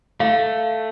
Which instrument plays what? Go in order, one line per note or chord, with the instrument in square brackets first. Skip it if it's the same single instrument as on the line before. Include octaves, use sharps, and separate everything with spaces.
[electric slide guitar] A3 [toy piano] F5